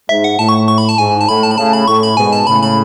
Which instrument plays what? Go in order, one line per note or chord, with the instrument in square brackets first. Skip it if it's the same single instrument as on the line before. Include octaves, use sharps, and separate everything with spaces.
[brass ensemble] G#2 [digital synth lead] E5
[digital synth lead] F#5
[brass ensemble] A2 [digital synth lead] A5
[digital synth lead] C#6
C#6
B5
A5
[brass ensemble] G#2 [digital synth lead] G#5
[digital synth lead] A5
[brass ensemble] A2 [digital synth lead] B5
[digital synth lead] A5
B5
[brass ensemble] A2 C#3 [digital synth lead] A5
[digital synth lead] B5
[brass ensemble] A2 [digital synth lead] C#6
[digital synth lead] B5
[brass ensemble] G#2 B2 [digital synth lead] G#5
[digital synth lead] A5
[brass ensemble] A2 C#3 [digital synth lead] B5
[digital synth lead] B5